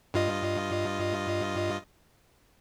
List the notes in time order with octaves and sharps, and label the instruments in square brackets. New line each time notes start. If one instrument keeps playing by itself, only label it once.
[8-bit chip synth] G2 F4 D#5